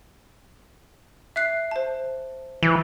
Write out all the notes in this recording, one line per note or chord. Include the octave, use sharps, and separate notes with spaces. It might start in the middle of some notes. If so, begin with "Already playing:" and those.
E5 F#6 C7
C5 A5
E3